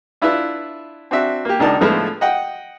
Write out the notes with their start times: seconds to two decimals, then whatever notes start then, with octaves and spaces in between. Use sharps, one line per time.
0.22 D4 E4 F4 B4 E5
1.11 C4 D4 F#4 E5
1.45 A#3 G4
1.59 G#1 C#2 D4 D#4 A#4 A5
1.81 A2 D3 F3 G#3 A3 B3
2.21 D#5 F#5 G5